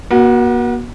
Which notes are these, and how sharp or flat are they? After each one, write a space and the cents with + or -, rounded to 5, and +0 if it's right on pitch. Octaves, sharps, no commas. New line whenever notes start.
A#3 +45 F#4 +0